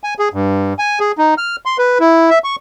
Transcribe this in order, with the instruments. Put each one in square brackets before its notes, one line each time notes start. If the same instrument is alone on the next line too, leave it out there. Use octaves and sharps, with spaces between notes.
[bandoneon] G#5
G#4
G2
G#5
G#4
D#4
F6
C6
B4
E4
E5
C#6